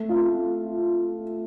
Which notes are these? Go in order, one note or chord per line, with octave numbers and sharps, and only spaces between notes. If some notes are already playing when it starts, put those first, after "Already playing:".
Already playing: A3
F4